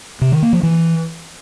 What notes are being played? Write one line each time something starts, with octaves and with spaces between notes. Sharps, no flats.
C3
D#3
A#3
F3
E3